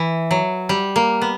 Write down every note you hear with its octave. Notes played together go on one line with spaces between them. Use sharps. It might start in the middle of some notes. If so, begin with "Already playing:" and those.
Already playing: E3
F#3
G3
A#3
B3